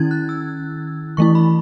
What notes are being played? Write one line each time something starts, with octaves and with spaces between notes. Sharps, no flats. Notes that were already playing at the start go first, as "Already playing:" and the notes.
Already playing: D#3 C#4 E4 G#6 A6
F#6
E6
E3 A3 E4 C#6
B5